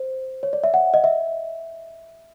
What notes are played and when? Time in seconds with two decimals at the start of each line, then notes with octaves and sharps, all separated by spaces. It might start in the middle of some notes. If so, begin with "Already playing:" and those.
Already playing: C5
0.43 C#5
0.53 D5
0.64 E5
0.74 F#5
0.94 D#5
1.04 E5